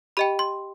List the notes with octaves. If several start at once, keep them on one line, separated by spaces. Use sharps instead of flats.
G4 D#5 G5 B5
C6